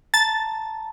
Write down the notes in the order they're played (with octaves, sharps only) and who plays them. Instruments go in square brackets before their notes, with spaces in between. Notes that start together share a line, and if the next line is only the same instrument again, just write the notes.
[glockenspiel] A5 A#5 [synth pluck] A6